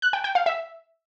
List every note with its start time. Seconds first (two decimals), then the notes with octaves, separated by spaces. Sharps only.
0.02 F#6
0.13 G5
0.24 G5
0.35 F5
0.46 E5